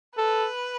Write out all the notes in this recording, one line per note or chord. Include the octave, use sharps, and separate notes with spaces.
A4 B4